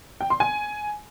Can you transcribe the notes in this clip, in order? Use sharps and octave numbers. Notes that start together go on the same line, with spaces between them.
G5
C6
G#5